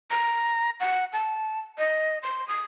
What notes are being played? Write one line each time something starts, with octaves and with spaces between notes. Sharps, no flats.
A#5
F#5
A5
D#5
C6
D#6